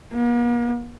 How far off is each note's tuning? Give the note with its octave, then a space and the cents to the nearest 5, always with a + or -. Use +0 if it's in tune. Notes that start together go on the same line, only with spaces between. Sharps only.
A#3 +45